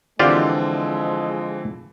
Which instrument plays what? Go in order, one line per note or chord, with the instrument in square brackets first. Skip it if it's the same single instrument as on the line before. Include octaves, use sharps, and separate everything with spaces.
[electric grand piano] D3 E3 C4 [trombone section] F3 G#3 [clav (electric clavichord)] F4 G4 D5